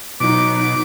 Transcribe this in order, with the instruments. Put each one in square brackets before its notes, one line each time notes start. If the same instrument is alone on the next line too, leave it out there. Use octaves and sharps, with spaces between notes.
[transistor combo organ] B2 [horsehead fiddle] F#3 D#4 [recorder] D6